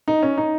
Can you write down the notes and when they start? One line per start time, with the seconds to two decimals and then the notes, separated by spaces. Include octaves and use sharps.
0.08 D#4
0.23 C#4
0.38 D#4